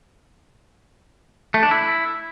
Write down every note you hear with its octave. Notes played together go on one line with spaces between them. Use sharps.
A3
D4
E4